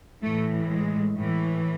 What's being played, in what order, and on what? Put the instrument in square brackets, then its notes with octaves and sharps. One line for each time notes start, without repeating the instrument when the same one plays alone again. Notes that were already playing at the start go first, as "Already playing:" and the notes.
[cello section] A2 E3 A3
G#3
A2 E3